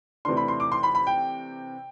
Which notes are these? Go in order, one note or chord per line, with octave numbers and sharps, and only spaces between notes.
C3 E3 A3 D4 C6
B5
C6
D6
C6
B5
B5
G5